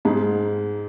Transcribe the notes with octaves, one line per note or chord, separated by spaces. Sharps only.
G#2 G#3